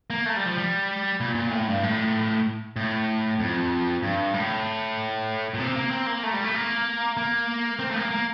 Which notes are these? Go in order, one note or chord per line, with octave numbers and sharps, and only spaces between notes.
A#3
A3
G3
F3
G3
A#2
A#2
A2
G2
A2
A2
F2
G2
A2
A#2
C3
A#3
C4
A#3
A3
G3
A3
A#3
A#3
C4
A3
A#3
A#3